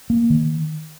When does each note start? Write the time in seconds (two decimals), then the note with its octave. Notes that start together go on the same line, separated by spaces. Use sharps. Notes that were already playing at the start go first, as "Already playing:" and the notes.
0.10 A#3
0.30 D#3